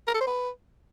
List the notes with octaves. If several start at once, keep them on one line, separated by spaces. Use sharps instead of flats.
A#4
A4
C5
B4